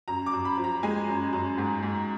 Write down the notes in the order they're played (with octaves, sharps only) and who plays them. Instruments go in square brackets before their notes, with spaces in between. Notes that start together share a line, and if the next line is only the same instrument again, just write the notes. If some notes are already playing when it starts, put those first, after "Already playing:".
[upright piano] F#2 A#5
D6
F#2
B5
F3
A#5
G#3 G#5
F#2
F#2
G#2
G#2